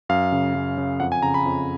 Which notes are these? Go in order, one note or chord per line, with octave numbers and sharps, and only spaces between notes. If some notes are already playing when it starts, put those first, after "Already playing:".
F#2 F5
C#3
F#2
C#3
F2 F#5
G#5
C#3 A#5
B5
F2